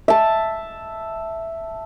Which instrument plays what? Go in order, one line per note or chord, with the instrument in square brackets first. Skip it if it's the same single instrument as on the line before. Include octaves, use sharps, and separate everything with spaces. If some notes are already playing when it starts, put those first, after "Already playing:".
[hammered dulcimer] E5 A5